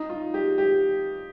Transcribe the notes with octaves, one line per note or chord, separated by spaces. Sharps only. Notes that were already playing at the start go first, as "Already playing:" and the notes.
Already playing: D#4
F4
G4
G4